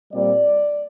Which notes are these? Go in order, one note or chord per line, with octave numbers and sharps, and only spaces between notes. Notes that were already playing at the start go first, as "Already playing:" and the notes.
A#2 G3 C4 D5